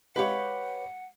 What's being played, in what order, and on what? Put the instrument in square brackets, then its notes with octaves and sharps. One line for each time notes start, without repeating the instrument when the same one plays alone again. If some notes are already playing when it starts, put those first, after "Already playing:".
[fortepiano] G#3 G4 F5 [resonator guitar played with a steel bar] B4 C#5 [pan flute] F#5